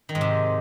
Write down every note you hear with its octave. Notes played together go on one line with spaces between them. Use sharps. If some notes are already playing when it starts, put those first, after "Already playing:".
D#3
G#2
C3